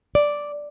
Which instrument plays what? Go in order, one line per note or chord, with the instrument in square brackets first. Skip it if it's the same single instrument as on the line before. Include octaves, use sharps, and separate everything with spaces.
[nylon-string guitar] D5